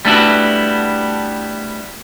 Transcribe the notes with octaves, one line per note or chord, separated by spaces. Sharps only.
G3 A3 B3 D4 E4 F#4